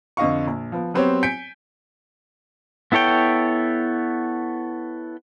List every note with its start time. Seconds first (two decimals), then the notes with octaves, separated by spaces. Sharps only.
0.17 F2 D3 D#5 F5 C#6
0.47 A#1
0.72 F3 B3
0.94 F#3 B3 C4 G4 C5 C#5
1.23 G#5 G6 B6 C#7 D7
2.92 B3 E4 A4 C#5 G5